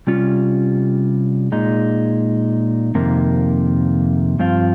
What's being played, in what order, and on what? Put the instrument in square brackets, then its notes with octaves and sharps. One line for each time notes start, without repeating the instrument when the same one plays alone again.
[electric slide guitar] C3 G3 C#4 F4
A#2 G#3 D#4
F2 C3 D#3 A#3
G2 F3 C4 F4